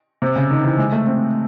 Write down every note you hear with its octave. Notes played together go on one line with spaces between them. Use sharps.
C3
C#3
D#3
E3
G#3
A3
C4